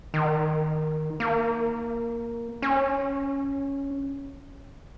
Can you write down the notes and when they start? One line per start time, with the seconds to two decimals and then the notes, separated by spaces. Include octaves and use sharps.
0.14 D#3
1.20 A#3
2.62 C#4